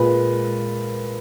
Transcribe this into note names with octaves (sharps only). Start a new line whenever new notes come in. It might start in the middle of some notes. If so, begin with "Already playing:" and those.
Already playing: A#2 G#3 B4